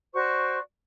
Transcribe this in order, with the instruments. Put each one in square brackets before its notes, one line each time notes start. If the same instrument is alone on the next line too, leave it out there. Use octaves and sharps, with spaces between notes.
[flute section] F#4 C5 D5 C#6